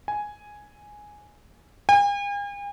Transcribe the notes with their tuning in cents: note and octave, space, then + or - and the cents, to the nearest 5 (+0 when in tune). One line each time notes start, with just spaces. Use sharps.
G#5 +0
G#5 -45